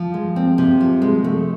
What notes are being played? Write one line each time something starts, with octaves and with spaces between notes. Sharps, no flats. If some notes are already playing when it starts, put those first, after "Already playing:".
Already playing: F3
G#3
C4
C3
F3
G#3
A3